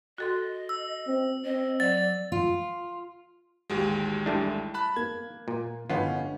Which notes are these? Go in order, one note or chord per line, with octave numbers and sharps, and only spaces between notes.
F#4 A4 D#5 C6
E6
C4
C4 D#5
F#3 D5 A6
F4
A1 D#2 G#3 F#4 G4
G3 A3 D4 E4
A5 B5 F#6
A#3 G#6
A#2
G1 A2 B3 C#4 F4 D#5